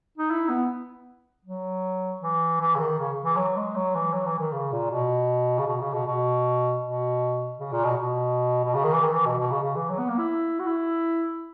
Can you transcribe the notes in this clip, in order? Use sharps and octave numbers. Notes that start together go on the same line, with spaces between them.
D#4
E4
B3
F#3
E3
E3
C#3
D#3
C#3
E3
F#3
G#3
F#3
E3
F#3
E3
D#3
C#3
A#2
B2
C#3
B2
C#3
B2
B2
B2
C#3
A#2
B2
B2
B2
C#3
D#3
E3
D#3
E3
B2
B2
C#3
C#3
E3
F#3
B3
A#3
E4
F#4
E4